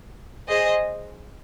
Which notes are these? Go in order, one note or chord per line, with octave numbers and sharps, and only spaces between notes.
G#4 C5 D#5